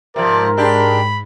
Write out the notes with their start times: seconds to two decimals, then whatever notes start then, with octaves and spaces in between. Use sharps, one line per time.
0.16 G#2 C3 F3 A#4 D5
0.57 G#3 D4 G4 B5